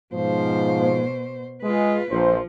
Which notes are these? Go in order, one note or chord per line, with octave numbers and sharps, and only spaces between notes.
G#2 B2 F3 C5
G#3 F4 B4
A#1 F3 C5